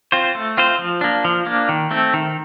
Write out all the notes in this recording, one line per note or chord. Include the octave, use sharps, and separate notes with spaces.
C4 F4 C5
A3
C4 F4 C5
F3
A#3 D4
F3
A#3 D4
D#3
A3 C4
D#3